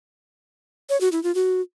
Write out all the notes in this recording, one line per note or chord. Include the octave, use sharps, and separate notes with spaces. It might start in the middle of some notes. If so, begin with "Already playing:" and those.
C#5
F#4
E4
F4
F#4